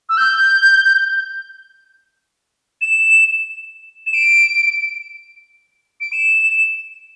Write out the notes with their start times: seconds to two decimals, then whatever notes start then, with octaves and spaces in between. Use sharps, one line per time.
0.09 E6
0.17 G6
2.81 E7
4.06 E7
4.14 D7
6.01 D7
6.12 E7